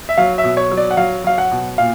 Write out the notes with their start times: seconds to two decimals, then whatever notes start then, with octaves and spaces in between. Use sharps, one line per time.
0.09 E5
0.18 F#3 F5
0.38 E5
0.44 B2
0.57 C#5
0.71 F#3
0.77 D5
0.91 F#5
0.97 F#3 F5
1.24 F#3 F5
1.38 F#5
1.51 B2
1.78 A#2 F5